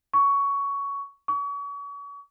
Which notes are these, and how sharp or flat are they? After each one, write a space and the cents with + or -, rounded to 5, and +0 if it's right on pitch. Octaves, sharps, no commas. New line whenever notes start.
C#6 +15
C#6 +40